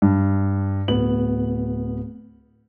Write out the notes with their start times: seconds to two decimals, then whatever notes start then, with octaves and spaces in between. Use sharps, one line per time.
0.02 G2
0.88 D1 B3 F#7